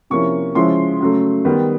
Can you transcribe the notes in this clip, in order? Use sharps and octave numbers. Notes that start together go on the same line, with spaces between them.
C3 F3 A#3 C#4 E4 C#6
C#3 F3 G#3 C#4 E4 C6
C#3 F#3 A3
D#3 G3 B3